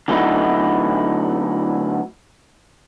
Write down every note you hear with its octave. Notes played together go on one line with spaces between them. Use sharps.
D3 F#3 A3 B3 D#4 E4